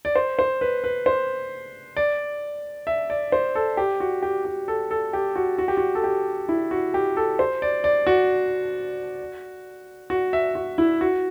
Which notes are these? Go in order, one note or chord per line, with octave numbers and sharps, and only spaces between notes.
D5
C5
C5
B4
B4
C5
D5
E5
D5
C5
A4
G4
F#4
G4
G4
A4
A4
G4
F#4
F#4
G4
F#4
A4
G4
E4
F#4
G4
A4
C5
D5
D5
F#4
F#4
E5
F#4
E4
F#4